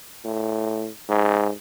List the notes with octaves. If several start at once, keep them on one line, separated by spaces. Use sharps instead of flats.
A2
G#2